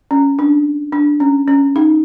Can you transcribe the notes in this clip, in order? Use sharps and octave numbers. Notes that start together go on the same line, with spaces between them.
C#4
D4
D4
C#4
C#4
D#4